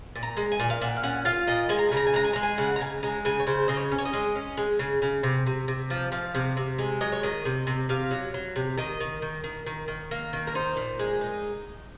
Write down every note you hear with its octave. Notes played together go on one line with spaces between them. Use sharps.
A#2
A#5
G#3
G#5
A#2
F5
A#2 F#5
F5
C#4 F#5
F4 F5
A#2 D#5
G#3 G#5
A#5
G#5
C#3
A#5
G#5
G#3 A#5
G#5
G#3 A#5
G#5
C#3 F#5
A#5
C#3 G#5
G#3 A#5
C#3 G#5
C#5
C#3 C5
C#3 D#5
C#5
C#4
C#5
D#5
G#3
C#4
G#3
C#3
C#3
C3
C3
C3
F3
F3 F5
C3
C3
G#3
F#3 D#5
C#5
D#3 D#5
C3
C3
C3 F5
F#3
F#3
C3
D#3 D#5
D#3
D#3
D#3
D#3
D#3
A#3
D#3
A#4
D#4 C5
A#2
G#3
D#4